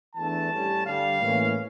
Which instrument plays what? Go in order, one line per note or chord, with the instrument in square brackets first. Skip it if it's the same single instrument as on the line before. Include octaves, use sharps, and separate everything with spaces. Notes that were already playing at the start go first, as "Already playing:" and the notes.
[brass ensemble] E2 E3 A3 D4 A5
A2 G3 C#4
G2 D3 G3 F5
A2 E3 A#3 C#4